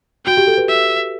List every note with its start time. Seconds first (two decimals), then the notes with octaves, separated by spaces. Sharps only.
0.26 F#4 G5
0.37 G4
0.47 A4
0.58 B4
0.69 E5